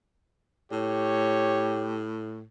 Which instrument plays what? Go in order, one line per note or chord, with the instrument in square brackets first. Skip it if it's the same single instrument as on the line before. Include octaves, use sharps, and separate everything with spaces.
[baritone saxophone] A2 [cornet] G4 [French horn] C#5